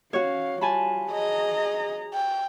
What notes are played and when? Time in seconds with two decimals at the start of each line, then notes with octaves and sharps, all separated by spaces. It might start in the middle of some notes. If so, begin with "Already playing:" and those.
0.13 C#4 F#4 C#5 F5
0.61 G3 F4 G#5 A5 B5
1.12 G#4 D#5 A#5
2.14 G5